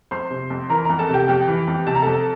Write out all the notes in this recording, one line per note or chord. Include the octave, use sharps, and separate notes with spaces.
F2 C5 C6
C3
F2
E3 A#4 A#5
F2 A#4 A#5
A4 A5
C3
G4 G5
F2 G4 G5
E3
F2
C3 A5
A#5
F2 A4 A5